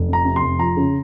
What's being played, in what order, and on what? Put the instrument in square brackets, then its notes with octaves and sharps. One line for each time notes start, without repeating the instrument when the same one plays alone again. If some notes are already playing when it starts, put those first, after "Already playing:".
Already playing: [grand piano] F1
F2
A#5
C3
C6
F1
F3 A#5
C#3